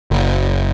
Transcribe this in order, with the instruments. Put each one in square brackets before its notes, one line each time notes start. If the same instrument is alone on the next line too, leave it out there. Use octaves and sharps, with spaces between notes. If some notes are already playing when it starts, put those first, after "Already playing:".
[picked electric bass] F#1